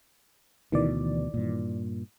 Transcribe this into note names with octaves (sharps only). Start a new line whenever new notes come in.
D2 B2 D#3 E3 D5
G2 A#2